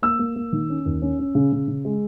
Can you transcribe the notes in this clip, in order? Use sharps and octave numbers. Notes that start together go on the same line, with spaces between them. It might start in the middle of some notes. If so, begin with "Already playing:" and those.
A#3 E6
A#3
A#3
D#3
C#4
D#2
C#4
C#4
C#3
C#3
C#3
G#3